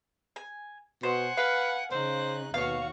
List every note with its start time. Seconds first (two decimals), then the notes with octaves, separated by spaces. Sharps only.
0.36 G#5
1.03 B2 C5 F#5 G#5
1.37 B4 F5
1.91 C#3 D#4 C5 F#6
2.54 D#2 B2 F#4 C#5 F5 C#6